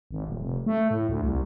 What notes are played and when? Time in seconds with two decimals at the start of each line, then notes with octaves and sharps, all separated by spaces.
0.11 G#1
0.27 D#1
0.40 F1
0.66 A3
0.91 A2
1.09 D2
1.24 C2